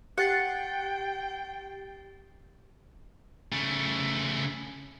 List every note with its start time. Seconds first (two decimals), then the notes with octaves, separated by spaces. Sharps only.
0.18 G4 F#5 G5 A6 C7
3.52 C#3 A3